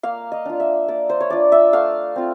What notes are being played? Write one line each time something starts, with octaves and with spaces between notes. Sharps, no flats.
A#3 F5
D#5
D4 F4
E5
A#3 D5
C5
C#5
D4 F4 D5
E5
A3 F5
C4 F4